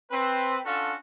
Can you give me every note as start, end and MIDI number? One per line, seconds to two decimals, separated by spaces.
0.11 0.59 60
0.11 0.59 71
0.65 0.94 61
0.65 0.94 62
0.65 0.94 65
0.65 0.94 66
0.65 0.94 69